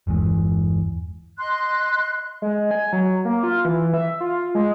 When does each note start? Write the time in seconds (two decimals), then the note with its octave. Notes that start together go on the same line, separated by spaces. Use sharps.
0.07 G1 E2 E3 G#3
1.39 D#5 C6 F#6
2.42 G#3
2.71 G#5
2.93 F#3
3.25 A#3
3.43 F4
3.65 E3
3.94 E5
4.20 F4
4.55 G#3